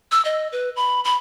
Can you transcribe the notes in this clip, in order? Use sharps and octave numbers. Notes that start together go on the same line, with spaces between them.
E6
D#5
B4
B5
B5